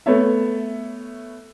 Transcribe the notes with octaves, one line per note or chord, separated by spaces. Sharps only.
A3 B3 C#5 E5